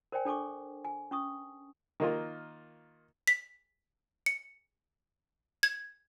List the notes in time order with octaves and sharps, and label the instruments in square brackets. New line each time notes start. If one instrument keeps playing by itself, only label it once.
[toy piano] A#4 C5 D5 G5 G#5
D4 A4 G#5 C#6 D6
G#5
C#4 C#6 D#6
[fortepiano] D#3 A#3 F4
[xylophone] B6
C#7
G#6